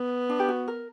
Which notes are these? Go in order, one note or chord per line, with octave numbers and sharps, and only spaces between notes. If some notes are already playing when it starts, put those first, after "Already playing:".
Already playing: B3
D4
G4
F#4
A#4